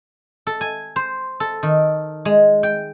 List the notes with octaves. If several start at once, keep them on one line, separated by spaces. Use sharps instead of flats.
A4
G#5
C5
A4
D#3
G#3
G5